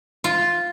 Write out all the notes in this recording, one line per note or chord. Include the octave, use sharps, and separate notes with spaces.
F4